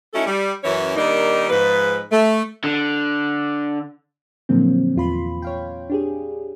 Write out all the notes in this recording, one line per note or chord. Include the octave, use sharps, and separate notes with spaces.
A3 C#4 D#4 E4 F#4 A4
G3
F#2 E3 C#4 E4 C#5
D#3 G3 A#3 D4 D#4
G#2 F3 B4
A3
D3
A#2 D3 F3 F#3 A#3 C4
E2 F4 B5 C6
C#5 F5 G5
D4 G4 G#4